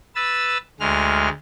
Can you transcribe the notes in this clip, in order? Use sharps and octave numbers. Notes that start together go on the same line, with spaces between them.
B4 E6 A6
D2 G#3 F6